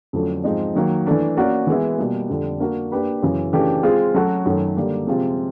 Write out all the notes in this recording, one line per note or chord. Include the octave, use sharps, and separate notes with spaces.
F2 D3 F#3 A3 C#4
G#2 F3 G#3 C4 D#4
D#3 F#3 A#3
E3 A3 D4
A#3 C#4 F#4 A#4 D5
E3 G#3 B3 E4
B2 G3 A#3
F2 D3 G3
A#3 D4 F#4 A#4
A#3 D4 G4 B4
F#2 C#3 E3
C#3 E3 A3 D4 G4
G#3 C4 F4 G#4
F#3 A3 C#4 F#4 A4
F#2 D#3 F#3 A3
D3 G3 A#3 D4 G4
C3 F3 G#3 C4 F4